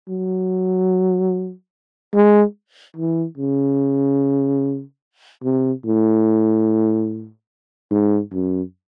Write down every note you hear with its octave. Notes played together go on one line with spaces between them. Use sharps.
F#3
G#3
E3
C#3
C3
A2
G#2
F#2